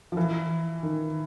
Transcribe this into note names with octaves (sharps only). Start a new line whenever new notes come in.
F3
E3
D#3